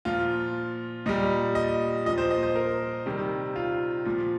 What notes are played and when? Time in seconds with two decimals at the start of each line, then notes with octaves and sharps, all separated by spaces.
0.05 A#2 F3 F4
1.06 A#2 G3 D#5
1.55 D#5
2.05 F3 D#5
2.09 A#2
2.18 C5
2.30 D#5
2.43 C5
2.55 A#4
3.06 C3 D#3 G3
3.56 F4
4.05 A#2 F3